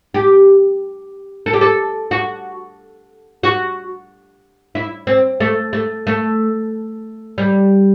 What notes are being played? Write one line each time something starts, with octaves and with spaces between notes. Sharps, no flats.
G4
A4
G4
A4
F#4
F#4
E4
C4
A3
A3
A3
G3